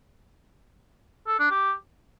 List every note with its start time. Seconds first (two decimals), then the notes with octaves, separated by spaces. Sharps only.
1.28 A4
1.39 D4
1.51 G4